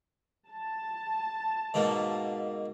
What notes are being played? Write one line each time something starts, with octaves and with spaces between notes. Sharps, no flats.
A5
G#2 B2 A#3